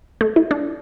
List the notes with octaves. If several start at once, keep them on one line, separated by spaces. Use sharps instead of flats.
A3
E4
D4